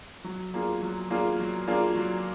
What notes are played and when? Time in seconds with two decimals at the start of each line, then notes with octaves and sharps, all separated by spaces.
0.24 F#3
0.54 A#3 D4 F4 G#4
0.82 F#3
1.10 A#3 D4 F4 G#4
1.40 F#3
1.67 A#3 D4 F4 G#4
1.96 F#3